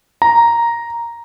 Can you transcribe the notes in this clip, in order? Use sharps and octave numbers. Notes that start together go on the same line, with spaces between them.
A#5